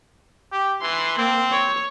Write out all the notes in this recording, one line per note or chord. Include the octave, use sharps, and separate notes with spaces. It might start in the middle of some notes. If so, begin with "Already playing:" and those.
G4
E3 C6
A#3 C4
C#5